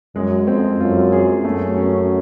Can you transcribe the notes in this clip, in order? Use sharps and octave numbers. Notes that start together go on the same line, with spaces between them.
F#2 G#3
F2 C4
F#2 F4
G#4
F#2 A3
C#4